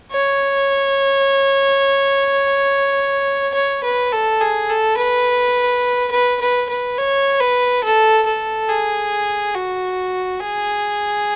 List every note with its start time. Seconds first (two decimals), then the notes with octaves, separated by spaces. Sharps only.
0.13 C#5
3.54 C#5
3.83 B4
4.12 A4
4.41 G#4
4.70 A4
4.97 B4
6.11 B4
6.41 B4
6.69 B4
6.98 C#5
7.40 B4
7.84 A4
8.26 A4
8.69 G#4
9.55 F#4
10.40 G#4